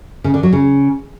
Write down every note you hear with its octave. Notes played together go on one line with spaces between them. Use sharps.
C#3
D3
F#3
C#3